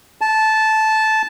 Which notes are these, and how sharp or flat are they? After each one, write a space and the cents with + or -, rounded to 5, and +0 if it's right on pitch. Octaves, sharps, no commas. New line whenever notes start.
A5 -10